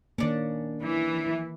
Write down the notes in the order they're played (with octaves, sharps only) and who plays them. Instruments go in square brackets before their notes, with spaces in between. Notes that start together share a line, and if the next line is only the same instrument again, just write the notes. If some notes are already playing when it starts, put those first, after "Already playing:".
[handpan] D#3 A#3 [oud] C#4 D4
[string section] E3 [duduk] E4